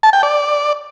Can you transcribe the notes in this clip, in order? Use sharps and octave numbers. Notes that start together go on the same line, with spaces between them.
A5
G5
D5